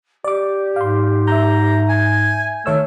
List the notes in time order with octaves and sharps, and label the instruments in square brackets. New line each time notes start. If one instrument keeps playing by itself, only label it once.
[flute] G4 [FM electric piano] D5 D6
[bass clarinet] G#2 [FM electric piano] F5 C6
[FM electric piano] E5 G6 [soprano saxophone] A#5
[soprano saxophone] G#5 [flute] G#6
[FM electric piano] D#3 C#5 E6 [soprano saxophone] A3 [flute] F6